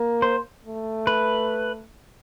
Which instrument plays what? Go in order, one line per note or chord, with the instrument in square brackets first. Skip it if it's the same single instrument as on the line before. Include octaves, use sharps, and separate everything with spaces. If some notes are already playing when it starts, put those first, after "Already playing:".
Already playing: [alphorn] A#3
[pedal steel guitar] C5
[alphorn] A3
[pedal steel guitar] B4